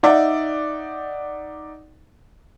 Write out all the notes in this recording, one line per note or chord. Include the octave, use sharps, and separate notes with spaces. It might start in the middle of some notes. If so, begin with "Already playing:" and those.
D#4 D5 E5 F#5